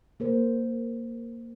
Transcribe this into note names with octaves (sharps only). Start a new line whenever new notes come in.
A#3 A#4 C5